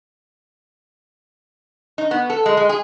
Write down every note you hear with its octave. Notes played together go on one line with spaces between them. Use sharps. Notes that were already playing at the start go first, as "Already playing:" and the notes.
D#4
B3
A4
G#3
G#3
G#4